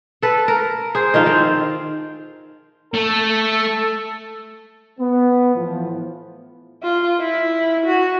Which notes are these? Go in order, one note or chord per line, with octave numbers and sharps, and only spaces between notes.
A4 B4
A#4
G#4 C5
D#3 F3 F4 C5
D#3 C4
A3 A4
B3
A2 E3 F3
F4
E4
F#4